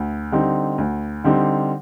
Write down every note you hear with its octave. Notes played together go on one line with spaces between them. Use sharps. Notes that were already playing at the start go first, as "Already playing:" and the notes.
Already playing: D2
D3 G3 C4 D#4
D2
D3 G3 C4 D#4